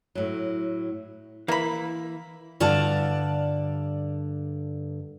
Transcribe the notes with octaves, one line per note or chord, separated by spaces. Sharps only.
A2 F#3
E3 A#3 B5
G2 D3 D5 F5 A5